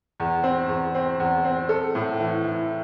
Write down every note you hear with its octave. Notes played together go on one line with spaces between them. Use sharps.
E2
C4
E2
C4
E2
C4
A4
A2
E3
E3